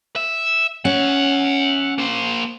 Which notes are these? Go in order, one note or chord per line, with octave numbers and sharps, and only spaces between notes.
E5
C#4 E5 F#5
A#3 C5